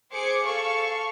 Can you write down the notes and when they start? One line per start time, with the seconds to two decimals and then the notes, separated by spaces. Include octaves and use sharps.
0.13 G#4 C5 D6 C#7
0.44 A4 F5 C#6